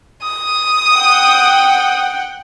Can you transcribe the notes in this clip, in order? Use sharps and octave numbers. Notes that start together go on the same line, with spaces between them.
D#6
F#5 G5